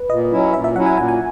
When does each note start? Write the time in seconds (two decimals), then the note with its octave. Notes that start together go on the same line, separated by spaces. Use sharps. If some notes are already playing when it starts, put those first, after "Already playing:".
Already playing: B4
0.10 A#2 D#5
0.32 F#3 C#4 E4
0.53 A#2 E5
0.64 E5
0.76 F#3 C#4 E4 F#5
0.86 G#5
0.97 A#2 G#5
1.08 G#5